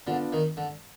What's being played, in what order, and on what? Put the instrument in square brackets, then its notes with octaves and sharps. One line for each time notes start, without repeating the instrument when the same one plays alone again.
[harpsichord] D3 [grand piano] B3 D4 F4
[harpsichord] D#3
D3